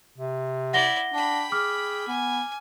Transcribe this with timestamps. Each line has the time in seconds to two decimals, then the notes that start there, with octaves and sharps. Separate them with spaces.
0.18 C3
0.73 E4 D5 F#5 A#6 G7
1.14 D4 G5 B5
1.52 G#4 D6 F6
2.07 B3 G#5